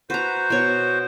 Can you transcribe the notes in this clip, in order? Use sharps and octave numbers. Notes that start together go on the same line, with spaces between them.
F#4 B4 C5 A#5
B2 C#5